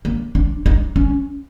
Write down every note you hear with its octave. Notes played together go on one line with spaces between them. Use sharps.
A#3
D4
D#4
C#4